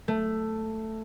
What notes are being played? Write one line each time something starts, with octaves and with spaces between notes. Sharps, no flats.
A3